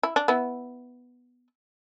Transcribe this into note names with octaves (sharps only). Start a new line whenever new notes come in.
E4
D4
B3 E4